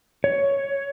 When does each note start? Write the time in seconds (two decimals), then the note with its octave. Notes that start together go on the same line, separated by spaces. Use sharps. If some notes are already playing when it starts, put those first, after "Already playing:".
0.24 C#5